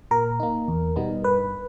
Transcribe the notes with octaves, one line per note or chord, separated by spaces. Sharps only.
A#2 A#4
A#3 D#4
E2
B2 G3 B3 D#4
G2 B4